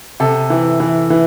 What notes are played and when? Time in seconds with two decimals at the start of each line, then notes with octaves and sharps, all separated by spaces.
0.20 C3 A4
0.50 E3
0.80 E3
1.10 E3